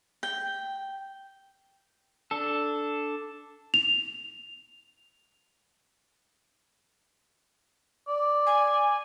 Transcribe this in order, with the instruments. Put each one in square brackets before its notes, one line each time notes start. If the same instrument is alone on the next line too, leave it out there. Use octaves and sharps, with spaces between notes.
[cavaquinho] G5
[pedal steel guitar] D4 A4
[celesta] F7
[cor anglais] D5
[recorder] G#5